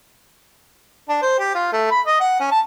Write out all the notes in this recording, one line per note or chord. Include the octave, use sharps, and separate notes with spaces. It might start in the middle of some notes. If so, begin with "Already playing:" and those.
D4
C5
G4
F4
A3
B5
D#5
F#5
C#4
A5